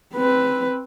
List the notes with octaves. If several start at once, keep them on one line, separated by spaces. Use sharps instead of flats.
C4 B4